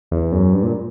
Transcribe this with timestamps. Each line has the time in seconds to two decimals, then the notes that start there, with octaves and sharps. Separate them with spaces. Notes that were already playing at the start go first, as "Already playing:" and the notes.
0.11 E2
0.32 F#2
0.53 G2
0.63 A#2